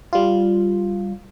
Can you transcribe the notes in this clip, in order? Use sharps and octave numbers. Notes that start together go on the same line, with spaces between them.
G3 F4